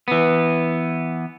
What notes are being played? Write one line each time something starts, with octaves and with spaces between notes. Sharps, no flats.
E3 B3